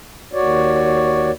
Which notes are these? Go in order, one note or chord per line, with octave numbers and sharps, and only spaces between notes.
D#2 F#4 C#5 D5